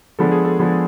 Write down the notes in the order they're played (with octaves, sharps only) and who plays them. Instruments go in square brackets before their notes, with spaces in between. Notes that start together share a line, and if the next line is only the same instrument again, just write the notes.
[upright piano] F3 G#3 B3 D4 [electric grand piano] A4
[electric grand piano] G#4
A4
[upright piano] F3 G#3 B3 D4